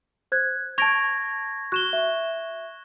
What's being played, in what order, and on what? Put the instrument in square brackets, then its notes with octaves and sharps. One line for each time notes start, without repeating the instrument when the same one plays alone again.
[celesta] C5 F#6 G#6
[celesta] A5 D7 F7 [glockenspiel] C#6 G#6 A#6
[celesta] F#4 C#6 [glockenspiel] F#6 E7 G7
[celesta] E5